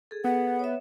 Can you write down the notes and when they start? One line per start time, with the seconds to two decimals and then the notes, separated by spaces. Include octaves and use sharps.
0.11 G#4 A4
0.24 B3 F#5
0.59 C#5 E5